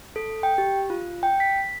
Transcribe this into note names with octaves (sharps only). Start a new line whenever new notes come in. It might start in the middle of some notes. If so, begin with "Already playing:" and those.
A4
G5
G4
F4
G5
B6